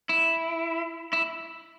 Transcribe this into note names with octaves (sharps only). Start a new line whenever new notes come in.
E4
E4